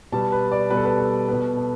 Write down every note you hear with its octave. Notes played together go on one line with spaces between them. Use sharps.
B2 G3 B3 A5
B4
D5
B2 G3 B3 B4
A4
B4
A4
B2 B3 B4
A4